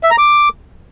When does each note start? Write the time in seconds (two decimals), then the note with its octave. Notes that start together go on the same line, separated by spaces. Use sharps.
0.03 E5
0.11 A#5
0.18 D6